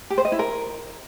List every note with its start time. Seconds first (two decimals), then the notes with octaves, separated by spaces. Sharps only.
0.10 G4
0.18 C5
0.25 D#5
0.32 E4
0.39 A#4